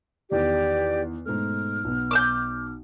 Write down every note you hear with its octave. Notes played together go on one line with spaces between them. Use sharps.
E2 D#3 G4 D5
G#2 B2 A3 F6
B1 B3
D6 E6 G6